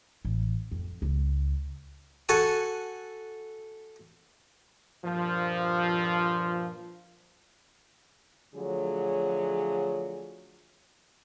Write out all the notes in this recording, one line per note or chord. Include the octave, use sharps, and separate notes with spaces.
A1
F2
C#2
F#4 A4 F#5 G#5 A5
G2 A#2 F3
D3 F3 F#3 A3 G#4 C#5